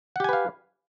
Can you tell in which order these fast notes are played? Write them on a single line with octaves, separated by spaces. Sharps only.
F#5 G4 G#5 B4 F5